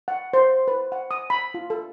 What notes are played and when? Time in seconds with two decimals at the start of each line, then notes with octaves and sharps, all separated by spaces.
0.08 F#5
0.33 C5
0.68 B4
0.92 F#5
1.11 D#6
1.30 B5
1.54 F4
1.70 A4